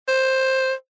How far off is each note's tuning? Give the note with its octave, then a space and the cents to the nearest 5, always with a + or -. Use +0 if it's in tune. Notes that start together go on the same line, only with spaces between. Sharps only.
C5 +10